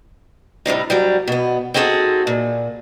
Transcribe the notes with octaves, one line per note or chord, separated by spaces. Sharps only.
A2 C3 G3 D#4
D2 F#3 G3
B2 B3
C4 D#4 F#4 G#4 A4 F#5
A#2